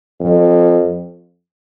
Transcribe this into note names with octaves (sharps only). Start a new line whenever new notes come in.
F2